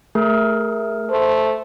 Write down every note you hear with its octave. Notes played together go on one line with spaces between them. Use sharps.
A3 G#4 A#4
A3 C5